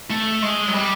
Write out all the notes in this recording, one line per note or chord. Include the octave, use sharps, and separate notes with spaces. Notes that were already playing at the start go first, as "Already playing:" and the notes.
A3
G#3
F#3
G3